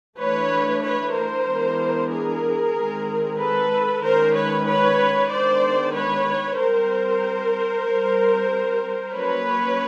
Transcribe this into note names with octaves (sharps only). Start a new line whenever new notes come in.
E3 A3 D4 B4 C#5
B4 C#5
A#4 C5
E3 G#3 B3 D4
G#4 A#4
D#3 G#3 C4
A4 B4
D#3 G#3 C#4 A#4 C5
B4 C#5
B4 C#5
D#3 G#3 B3 D4 C5 D5
B4 C#5
G3 C4 A#4 C5
G3 C4
F#3 A#3 C#4 B4 C#5